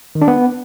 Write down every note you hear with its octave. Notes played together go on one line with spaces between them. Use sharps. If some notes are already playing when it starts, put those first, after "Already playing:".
D#3
D4
B3